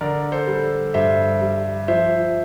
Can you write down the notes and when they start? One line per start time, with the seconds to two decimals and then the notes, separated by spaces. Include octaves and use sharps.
0.01 D3 A#4 D5
0.32 A4 C5
0.47 G3
0.94 G2 C5 E5
1.42 G3
1.88 F3 C5 E5